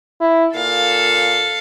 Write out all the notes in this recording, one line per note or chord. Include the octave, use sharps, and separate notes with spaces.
E4
A#2 A4 F5